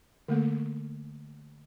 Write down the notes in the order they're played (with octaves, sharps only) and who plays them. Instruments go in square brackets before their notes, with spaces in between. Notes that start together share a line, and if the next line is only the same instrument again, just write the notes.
[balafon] D3 A3 A#3 A4